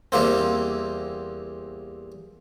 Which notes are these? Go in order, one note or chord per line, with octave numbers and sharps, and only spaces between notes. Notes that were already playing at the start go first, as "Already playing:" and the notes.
E2 G3 A#3 C4